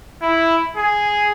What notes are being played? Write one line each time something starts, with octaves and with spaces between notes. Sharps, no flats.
E4
G#4